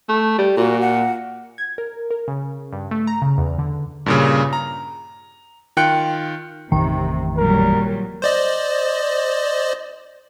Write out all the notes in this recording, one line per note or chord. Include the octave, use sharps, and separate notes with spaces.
A3
G3
A#2 F#4
F#5
G#6
A#4
A#4
C#3
G2
A3
A#5
C#3
E2
D3
G2 A#2 C#3
A#5
D#3 F4 G5 F#6 C#7
A1 F2 C3 D#3
A#2 F#3 G3 A#4
C5 D5 D#5